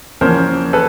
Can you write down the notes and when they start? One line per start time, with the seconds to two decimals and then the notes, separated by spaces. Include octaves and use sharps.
0.21 E2 C#3 F3 A#3 C#4 A#4 C5
0.73 A4 B4